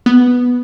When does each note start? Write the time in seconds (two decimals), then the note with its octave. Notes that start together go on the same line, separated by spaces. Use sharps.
0.06 B3